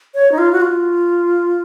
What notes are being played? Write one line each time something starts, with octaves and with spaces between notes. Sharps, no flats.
C#5
D#4
F4
F#4
F4